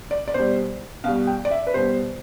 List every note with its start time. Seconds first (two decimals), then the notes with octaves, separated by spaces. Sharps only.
0.11 D5
0.28 D5
0.34 B2 G3 C5
1.04 B2 G3 F5
1.27 G5
1.45 D5
1.51 E5
1.67 B4
1.74 B2 G3 C5